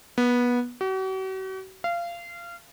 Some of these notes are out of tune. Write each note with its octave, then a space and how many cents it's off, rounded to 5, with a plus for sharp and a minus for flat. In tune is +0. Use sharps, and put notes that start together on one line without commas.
B3 -20
F#4 +45
F5 -25